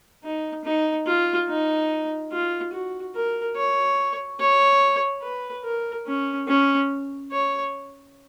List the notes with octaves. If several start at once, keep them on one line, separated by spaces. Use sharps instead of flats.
D#4
D#4
F4
D#4
F4
F#4
A#4
C#5
C#5
B4
A#4
C#4
C#4
C#5